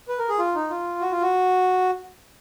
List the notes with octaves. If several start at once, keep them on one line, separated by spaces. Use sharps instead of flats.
B4
A#4
G#4
F4
D#4
F4
F#4
F4
F#4